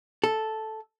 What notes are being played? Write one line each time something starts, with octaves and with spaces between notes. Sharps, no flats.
A4